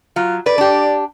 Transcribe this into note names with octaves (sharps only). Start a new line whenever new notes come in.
F#3 F4
B4 D5
D4 G4